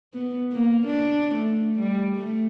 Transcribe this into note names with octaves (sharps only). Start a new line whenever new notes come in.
B3
A#3
D4
A3
G3
A3